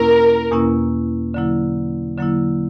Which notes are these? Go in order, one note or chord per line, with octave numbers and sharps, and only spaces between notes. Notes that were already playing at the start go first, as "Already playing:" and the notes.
Already playing: E2 B2 A#3 C#4 E4 A#4
E2 B2 A#3 C#4 E4
D3 F#3 A#3 E4
D3 F#3 A#3 E4